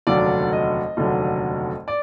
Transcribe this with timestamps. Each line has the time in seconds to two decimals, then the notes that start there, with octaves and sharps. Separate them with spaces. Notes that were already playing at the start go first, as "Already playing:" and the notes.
0.07 F1 D#2 D3 F#3 D5
0.52 D#5
0.97 F1 D#2 D3 F#3
1.88 D5